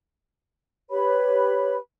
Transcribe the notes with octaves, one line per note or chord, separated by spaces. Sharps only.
G4 B4 C#5 B5